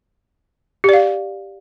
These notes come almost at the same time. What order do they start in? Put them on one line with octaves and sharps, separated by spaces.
G4 D5 F5